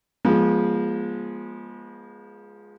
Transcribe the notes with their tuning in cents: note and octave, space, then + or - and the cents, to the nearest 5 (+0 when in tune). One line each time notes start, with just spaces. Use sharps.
F3 +5 G#3 +0 B3 -35